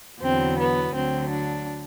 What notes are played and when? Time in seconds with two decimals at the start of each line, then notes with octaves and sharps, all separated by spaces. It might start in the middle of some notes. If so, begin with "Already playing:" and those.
0.22 E2 D3 F#3 C4
0.58 B3
0.94 D2 D3 F#3 C4
1.30 D4